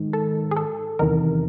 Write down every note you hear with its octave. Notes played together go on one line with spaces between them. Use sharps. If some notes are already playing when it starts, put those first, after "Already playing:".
Already playing: G#2 D#3
A4
G#4
A4
E2 C3 D#3 A#4